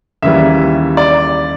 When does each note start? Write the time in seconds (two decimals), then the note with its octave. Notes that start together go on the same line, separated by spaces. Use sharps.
0.22 D#2 C#3 E3 G3 E5
0.97 D5